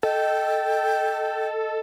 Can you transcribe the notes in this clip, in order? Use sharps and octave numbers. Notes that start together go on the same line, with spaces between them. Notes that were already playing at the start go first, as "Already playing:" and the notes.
A4 D#5 G5